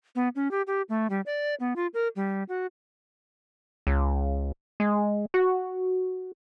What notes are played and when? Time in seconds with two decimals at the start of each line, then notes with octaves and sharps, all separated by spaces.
0.15 B3
0.36 C#4
0.51 G4
0.67 G4
0.89 A3
1.10 G3
1.26 D5
1.60 B3
1.76 F4
1.94 A#4
2.16 G3
2.49 F#4
3.87 C#2
4.80 G#3
5.34 F#4